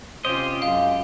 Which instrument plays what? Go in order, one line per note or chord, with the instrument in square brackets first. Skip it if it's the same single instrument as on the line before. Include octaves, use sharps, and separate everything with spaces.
[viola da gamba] C3 C#4 F4 [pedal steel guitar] G4 D#5 [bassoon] C5
[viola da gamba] F#2 [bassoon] G#3 [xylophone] F5